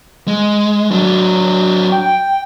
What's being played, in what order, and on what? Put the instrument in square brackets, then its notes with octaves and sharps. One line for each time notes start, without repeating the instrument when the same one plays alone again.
[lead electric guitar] G#3
F#3 D4
[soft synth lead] G5